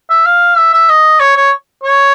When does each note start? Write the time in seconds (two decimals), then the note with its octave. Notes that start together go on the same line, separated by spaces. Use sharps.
0.10 E5
0.26 F5
0.58 E5
0.73 E5
0.89 D#5
1.20 C#5
1.36 C#5
1.84 C#5